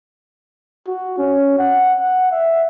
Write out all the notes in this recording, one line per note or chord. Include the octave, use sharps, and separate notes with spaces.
F#4
C#4
F#5
F#5
E5